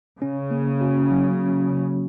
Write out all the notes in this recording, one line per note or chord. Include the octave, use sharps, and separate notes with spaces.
C#3 C#4
A#3
F#4
F#3
C#4
C#4